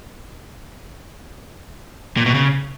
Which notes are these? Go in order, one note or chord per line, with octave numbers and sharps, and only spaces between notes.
A#2
B2
C#3